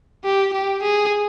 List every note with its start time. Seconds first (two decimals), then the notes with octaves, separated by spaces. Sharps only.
0.24 G4
0.53 G4
0.82 G#4